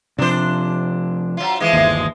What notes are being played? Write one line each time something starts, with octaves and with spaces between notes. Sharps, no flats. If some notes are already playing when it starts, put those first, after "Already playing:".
C3 F3 D4 C5
F#3 F4
E3 F3 G#3
G1 D#2